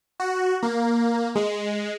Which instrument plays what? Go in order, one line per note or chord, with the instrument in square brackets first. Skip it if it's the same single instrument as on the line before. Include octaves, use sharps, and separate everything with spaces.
[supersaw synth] F#4
A#3
G#3